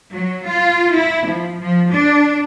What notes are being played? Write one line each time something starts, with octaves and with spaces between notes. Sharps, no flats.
F#3
F4
E4
F3
F3
D4